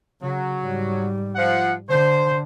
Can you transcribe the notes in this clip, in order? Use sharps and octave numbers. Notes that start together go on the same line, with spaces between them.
C#3 F#3
G#2 G3
F3 F#5
D3 C5